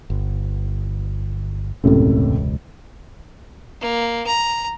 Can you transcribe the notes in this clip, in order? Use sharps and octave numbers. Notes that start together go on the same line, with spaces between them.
G1
E1 C#2 F#2 A2 C3
A#3
A#5